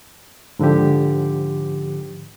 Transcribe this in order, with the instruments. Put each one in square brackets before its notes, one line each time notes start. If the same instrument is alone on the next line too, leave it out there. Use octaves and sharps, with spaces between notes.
[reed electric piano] G#2 D3 F3 G4